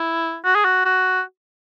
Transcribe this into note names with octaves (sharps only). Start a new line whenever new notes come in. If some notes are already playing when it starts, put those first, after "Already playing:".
Already playing: E4
F#4
G#4
F#4
F#4